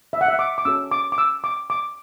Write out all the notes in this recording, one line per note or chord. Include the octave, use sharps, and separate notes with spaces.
E5
F#5
E5
D6
D6
C#4 F#4 A4 C#5 E6
D6
D6
E6
D6
D6